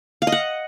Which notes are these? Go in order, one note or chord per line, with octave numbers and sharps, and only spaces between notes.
F5
D#5
F#5